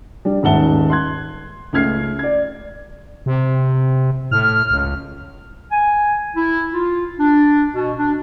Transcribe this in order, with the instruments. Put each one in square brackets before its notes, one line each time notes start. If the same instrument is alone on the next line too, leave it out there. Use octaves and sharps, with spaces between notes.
[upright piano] G3 D4
D#1 G#2 E5 F#5 A5 G7
C6 F#6 G#6
C#2 A3 F6 G#6 C7
D5 G#6
[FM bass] C3
[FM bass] A2 [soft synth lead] F6
[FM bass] C#2
[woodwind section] G#5
E4
F4
D4
B2
D4